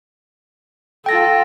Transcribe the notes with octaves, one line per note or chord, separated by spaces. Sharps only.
F4 A4 G5 A#6